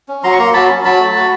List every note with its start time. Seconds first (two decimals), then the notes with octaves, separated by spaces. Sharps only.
0.08 C#4
0.24 F#3 A#5 C6
0.32 C#6
0.38 A#3 A#5 C6
0.54 F#3 A5 B5
0.70 C#4
0.85 F#3 A5 B5
1.00 A3
1.16 F#4